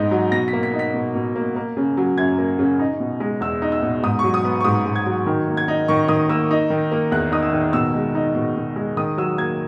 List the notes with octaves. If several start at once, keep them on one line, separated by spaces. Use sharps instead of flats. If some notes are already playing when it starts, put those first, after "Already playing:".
Already playing: G#2 B3 D#4
F#3
B2 A#6
B6
A#3
B6
D#4
B6
B2
B2
A#3
A#3
C#3
F#3
F#2 G#6
A#3
C#3
D#4
B2
G#3
E2 E6
D#4
E6
B2
G#2 D#6
F#3 C#6
D#6
B3
C#6
G#2 D#6
G#2
G#6
F#3
D#3
A#3
G#6
D#4
D#3 C#6
D#3 D#6
A#3 E6
D#4
D#3
A#3
E2 F#6
D#4 D#6
E6
D#3
B2 E6
G#3
D#4
B2
B2
G#3
D#3 D#6
F#3 E6
A#3 G#6